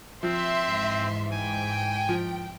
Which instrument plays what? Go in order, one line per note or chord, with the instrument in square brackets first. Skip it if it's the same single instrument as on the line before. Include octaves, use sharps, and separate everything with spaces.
[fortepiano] F3 [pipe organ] C4 [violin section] E5 C6
[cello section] G#2 E3
[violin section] G5 [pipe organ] G#5
[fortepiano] F3